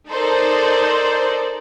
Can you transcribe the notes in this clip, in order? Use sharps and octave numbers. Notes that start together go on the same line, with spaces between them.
D#4 A4 A#4 C5 D5